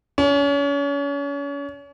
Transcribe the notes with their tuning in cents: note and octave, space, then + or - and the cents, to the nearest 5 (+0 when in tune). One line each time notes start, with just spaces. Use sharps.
C#4 +35